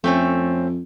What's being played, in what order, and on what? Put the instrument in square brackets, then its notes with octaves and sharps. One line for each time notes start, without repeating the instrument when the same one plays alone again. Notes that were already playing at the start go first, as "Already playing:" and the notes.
[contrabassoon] F2 [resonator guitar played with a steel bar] A3 C4 C#4